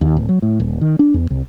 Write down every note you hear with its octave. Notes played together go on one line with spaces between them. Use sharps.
D#2
D1
F#3
A2
D#1
D#3
D4
E2
C2